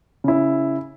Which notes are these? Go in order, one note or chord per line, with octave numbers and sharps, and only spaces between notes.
C#3 E4